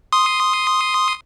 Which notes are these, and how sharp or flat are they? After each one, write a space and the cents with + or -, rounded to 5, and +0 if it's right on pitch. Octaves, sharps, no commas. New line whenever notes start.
C6 +0 D#6 +0